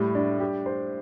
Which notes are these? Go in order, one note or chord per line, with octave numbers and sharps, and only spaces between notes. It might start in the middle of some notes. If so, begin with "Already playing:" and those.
Already playing: A2 G3
D4
G4
C5